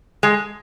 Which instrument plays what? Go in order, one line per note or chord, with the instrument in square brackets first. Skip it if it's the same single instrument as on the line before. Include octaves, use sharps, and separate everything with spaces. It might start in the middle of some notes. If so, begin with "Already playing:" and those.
[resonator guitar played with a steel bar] G#3